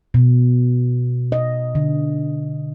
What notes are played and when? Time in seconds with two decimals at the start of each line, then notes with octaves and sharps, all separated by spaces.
0.14 B2
1.32 D#5
1.75 D3